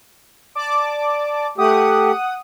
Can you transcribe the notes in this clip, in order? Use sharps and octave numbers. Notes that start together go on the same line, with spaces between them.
D5 A5 D6
A3 G4 F#5 D#6